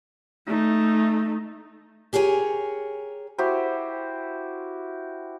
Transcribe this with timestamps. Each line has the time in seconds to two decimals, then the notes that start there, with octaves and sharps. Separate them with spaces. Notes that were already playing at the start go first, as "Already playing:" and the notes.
0.46 A3 D#4
2.13 G4 G#4 A#4 C#5 G#5
3.38 E4 F#4 G4 C5